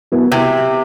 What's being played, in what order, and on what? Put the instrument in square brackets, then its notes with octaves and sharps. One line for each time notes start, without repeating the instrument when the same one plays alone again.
[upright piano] B2 F#3 B3 E4
[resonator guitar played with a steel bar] C3